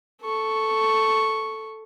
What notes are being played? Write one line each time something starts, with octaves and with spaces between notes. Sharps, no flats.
A4 C#6